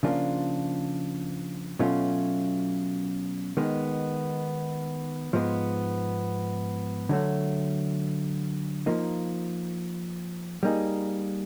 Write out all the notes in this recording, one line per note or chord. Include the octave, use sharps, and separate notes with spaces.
C#3 F3 A#3 D4 F4
B2 F#3 A3 C#4 F4
D#3 G#3 B3
G#2 F3 G#3 B3
D3 F#3 A3
F3 A#3 D#4
G3 A#3 D#4 G#4